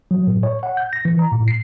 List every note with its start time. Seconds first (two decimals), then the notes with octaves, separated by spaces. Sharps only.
0.11 F#3
0.27 A2
0.43 C#5
0.63 F#5
0.77 G6
0.93 A#6
1.05 E3
1.19 A#5
1.32 A2
1.48 C7